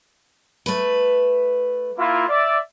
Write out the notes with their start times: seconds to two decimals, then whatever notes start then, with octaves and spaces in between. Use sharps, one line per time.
0.66 A3 B4
1.99 A#3 E4 F4
2.29 D5 E5